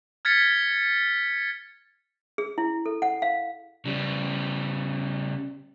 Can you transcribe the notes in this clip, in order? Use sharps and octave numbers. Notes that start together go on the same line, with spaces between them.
F6 G#6 A6 B6 C#7
G#4
E4
A4
F#5
F5
C#3 G3